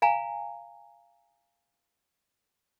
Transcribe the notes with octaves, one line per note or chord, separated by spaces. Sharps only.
F5 G#5 A#5